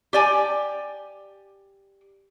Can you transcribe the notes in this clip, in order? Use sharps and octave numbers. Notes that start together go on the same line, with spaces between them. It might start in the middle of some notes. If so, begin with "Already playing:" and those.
G4 D5 G#5